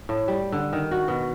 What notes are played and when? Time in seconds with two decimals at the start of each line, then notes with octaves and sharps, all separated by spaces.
0.09 A2
0.28 G3
0.52 D3
0.73 D#3
0.91 F#4
1.08 B2